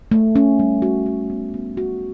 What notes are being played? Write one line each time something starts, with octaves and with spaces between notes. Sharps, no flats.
A3
C#4
G3
F#4
F#4
B3
B3
F#4